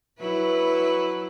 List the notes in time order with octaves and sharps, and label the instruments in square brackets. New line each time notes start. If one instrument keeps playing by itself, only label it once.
[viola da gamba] F#3 E4 B4